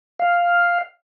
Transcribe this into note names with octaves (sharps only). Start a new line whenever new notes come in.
F5